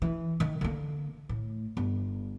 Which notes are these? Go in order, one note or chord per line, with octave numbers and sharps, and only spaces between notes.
E3
D#3
D3 A#3
A2
G1